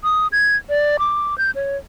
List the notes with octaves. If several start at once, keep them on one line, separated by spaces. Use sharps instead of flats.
D#6
G#6
D5
D6
G6
C#5